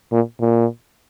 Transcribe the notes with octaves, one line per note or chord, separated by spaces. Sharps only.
A#2
A#2